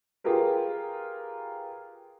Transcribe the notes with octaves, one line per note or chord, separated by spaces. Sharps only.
F4 G4 G#4 A#4 B4